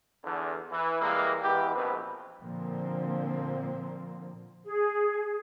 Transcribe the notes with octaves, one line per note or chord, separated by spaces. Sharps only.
E2 D3
E3
E3 G3 G#3 A#3
E3 G#3 B3 G4
A#1 G#2 B2 C4 B4
A#2 D3 F3 A#3 C4
G#4